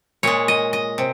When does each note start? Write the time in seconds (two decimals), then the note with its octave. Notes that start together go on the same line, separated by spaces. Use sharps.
0.23 A#2 G#3 C#5
0.48 D#5
0.73 D#5
0.98 C3